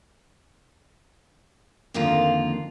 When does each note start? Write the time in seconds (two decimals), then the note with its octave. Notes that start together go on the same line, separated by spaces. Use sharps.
1.94 F2 D3 D#3 A#3 F4